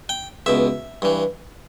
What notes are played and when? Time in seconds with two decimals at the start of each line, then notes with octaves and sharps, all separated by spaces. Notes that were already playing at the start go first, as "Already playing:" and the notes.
0.09 G5
0.46 C#2 B2 E5
1.02 G2 E3